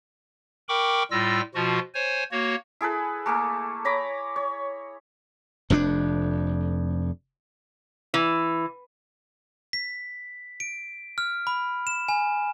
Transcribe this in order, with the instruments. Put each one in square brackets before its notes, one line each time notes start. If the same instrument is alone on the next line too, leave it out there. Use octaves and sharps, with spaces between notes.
[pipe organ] A#4 G5 B5 C#6 D6
A2 G3 F4 E6 A#6
B2 F3 F4 F#4
C5 C#5 G#5
A#3 F#4 C#5
[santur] E4 G#4 A4 B4
A3 A#3 G#4 A4
C#5 A#5 B5 D6
C#5
[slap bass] F1 F2 C#4 D4
[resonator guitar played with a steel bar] E3
[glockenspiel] B6
D7
F6
B5
E7
G#5